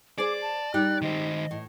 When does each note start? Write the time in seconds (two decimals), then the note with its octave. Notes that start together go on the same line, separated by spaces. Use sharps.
0.18 G#4 C5 D5 D6
0.42 A5
0.74 G3 D#4 G4 F#6
1.02 D#3 C5 D#5
1.51 A2